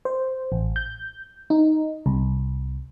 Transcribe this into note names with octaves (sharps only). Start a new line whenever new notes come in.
C5
A1
G6
D#4
C2